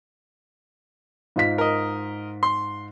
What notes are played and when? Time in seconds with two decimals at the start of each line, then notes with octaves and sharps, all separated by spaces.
1.36 G#2 F4 B6
1.58 A#4 D#5
2.43 C6